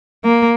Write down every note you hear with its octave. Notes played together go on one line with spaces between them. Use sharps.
A#3